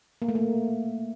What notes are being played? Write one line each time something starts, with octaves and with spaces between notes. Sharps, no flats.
A#3
A3
A#3